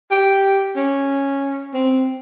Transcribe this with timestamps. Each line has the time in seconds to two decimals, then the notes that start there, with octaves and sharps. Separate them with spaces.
0.11 G4
0.76 C#4
1.73 C4